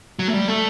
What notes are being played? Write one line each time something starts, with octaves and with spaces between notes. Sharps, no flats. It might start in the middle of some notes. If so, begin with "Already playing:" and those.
F#3
A3
G3
A3